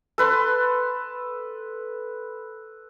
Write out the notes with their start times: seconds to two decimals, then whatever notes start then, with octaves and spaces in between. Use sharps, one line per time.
0.18 A4 B4 C6